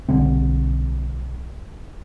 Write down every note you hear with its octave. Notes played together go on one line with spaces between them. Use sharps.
B1 D3 G3 C4